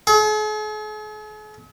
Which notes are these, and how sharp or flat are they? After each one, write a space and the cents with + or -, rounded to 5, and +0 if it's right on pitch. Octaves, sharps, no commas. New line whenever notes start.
G#4 +45